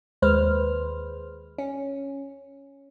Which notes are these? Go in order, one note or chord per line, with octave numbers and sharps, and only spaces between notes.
D#2 G#3 B4 C5 F6
C#4